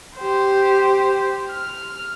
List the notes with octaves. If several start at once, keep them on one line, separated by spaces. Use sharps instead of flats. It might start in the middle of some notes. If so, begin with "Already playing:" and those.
G4 C5
F6